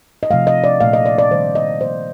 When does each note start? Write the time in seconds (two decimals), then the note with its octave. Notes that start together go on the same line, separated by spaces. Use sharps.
0.23 D#5
0.31 C3 F3 A3 F5
0.47 D#5
0.64 D5
0.80 A#2 A3 F5
0.93 D#5
1.06 D5
1.18 D5
1.31 D#3 G3 A#3 C5
1.55 D#5
1.80 C3 F3 A#3 C5